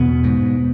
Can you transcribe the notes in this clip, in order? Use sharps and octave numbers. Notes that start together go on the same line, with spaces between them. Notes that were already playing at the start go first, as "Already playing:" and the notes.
Already playing: E2 B2 B3
G#2